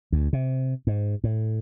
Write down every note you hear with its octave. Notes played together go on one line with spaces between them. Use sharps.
D2
C3
G#2
A2